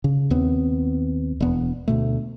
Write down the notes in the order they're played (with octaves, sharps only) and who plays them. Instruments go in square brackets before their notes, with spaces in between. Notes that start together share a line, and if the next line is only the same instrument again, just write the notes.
[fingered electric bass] C#3
D#2 B3 C4
E1 B3
D2 B2 A3